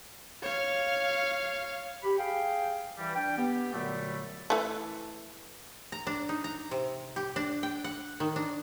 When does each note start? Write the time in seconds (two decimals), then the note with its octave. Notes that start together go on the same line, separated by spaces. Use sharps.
0.43 C#5 F5
2.04 G4 B5
2.18 G#4 F5 G5
2.98 E3 G3
3.16 D4 G5
3.37 B3 G4
3.73 F#2 A#2 D3 F#3 G3 A3
4.50 E3 A3
5.92 A#5
6.07 D4
6.29 D#4
6.44 A#5
6.71 C3
7.16 G4
7.36 D4
7.63 G5
7.84 F#5
8.20 D#3
8.36 D4